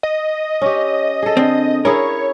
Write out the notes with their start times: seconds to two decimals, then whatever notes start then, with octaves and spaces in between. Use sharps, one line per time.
0.03 D#5
0.62 C#4 G4
1.23 G#4 A4
1.37 D3 C4
1.85 C#4 E4 G#4 A#4 C#5